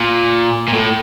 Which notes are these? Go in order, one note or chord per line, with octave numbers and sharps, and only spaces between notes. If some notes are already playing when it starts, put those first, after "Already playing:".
Already playing: A#2
A#2
A2